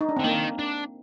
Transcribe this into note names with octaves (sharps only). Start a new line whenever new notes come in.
D#4
D4
C4
D3
D#3 A#3
D4